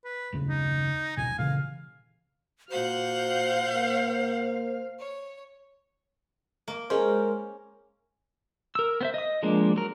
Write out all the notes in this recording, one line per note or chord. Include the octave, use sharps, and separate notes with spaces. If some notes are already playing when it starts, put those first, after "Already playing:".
B4
F#1 D#2 C#3
D#4
A#1 D#2 B2 G#5
A#2 C#3 E3 F5
A#2 F#4 C5 F5 F#5 G6
A#3
C#5
A#3
G#3 C#4 A#4 C5
A#4 E6
B3 C5 E5
D#5 D#6
F3 G#3 A#3 D4
F#3 A#4